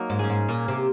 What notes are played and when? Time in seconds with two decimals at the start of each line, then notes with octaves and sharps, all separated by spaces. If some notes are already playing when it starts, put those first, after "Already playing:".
Already playing: F#3 A#3 D#4
0.10 G#2
0.19 C#4 G#4
0.30 G#2
0.49 A#2 A#3
0.68 C3